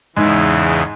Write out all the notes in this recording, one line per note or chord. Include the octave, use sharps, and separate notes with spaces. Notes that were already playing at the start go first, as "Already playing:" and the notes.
E2 G#2 C#3 E3 G#3